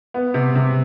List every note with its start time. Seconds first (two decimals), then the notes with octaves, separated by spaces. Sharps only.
0.14 B3
0.34 C3
0.55 C3